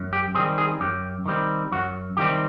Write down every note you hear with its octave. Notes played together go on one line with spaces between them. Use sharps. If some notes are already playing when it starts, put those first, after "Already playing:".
Already playing: F#2
G4
D#3 G3 C4 G#4
G#4
F#2 G4
D#3 G3 C4
F#2 F#4
D#3 G3 C4 G4